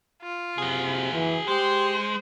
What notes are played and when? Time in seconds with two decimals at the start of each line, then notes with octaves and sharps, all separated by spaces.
0.22 F4
0.58 C3 F#4 G#4
1.13 E3
1.48 G#3 G4 C5